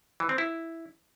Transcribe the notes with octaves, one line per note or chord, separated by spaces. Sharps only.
E3
C4
E4